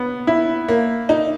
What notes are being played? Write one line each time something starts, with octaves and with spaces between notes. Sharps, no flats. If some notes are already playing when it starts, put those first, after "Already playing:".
Already playing: B3
E4
A#3
D#4